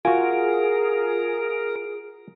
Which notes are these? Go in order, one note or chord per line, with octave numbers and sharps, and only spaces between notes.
F4 F#4 G#4 A#4 G#5